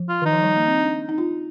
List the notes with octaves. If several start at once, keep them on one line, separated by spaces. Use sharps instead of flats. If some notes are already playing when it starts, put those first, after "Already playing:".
Already playing: F3
F4
D#3 D#4
F3
G3
A#3
C4
D4
D#4
F4